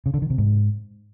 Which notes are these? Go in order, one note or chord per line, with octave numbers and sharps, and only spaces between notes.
C#3
D3
D#3
C3
G#2